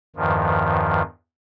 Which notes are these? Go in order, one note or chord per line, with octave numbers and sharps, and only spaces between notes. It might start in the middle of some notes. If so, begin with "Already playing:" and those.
E2 G2 D#3 F3